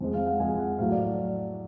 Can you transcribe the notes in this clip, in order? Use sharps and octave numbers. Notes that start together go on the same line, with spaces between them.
F2 F3 G#3
F5
F#5
F2 F3 G#3 G#5
F#5
A2 F#3 A3 F5
D5